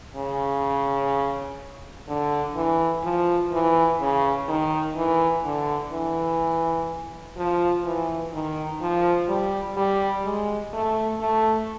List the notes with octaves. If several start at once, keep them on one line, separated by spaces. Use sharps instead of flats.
C#3
D3
E3
F3
E3
C#3
D#3
E3
D3
E3
F3
E3
D#3
F3
G3
G3
G#3
A3
A3